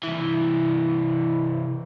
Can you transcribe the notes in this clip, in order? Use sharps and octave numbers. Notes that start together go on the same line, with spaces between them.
C2 E3 E4